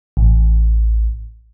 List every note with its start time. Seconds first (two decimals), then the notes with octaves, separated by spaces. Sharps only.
0.17 A1